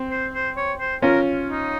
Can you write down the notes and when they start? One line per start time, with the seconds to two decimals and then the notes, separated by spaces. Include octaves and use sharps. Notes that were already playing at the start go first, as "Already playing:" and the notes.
Already playing: C4
0.11 C5
0.34 C5
0.57 C#5
0.80 C5
1.02 C#4 F4 A#4
1.48 D#4